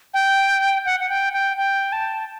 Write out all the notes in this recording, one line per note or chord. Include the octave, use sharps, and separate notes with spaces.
G5
F#5
F#5
G5
G5
G5
A5